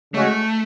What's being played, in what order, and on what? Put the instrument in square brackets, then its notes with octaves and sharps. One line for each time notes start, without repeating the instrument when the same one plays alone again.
[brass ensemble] C#3 G#3 C#4 F#4 C#5 [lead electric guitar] A3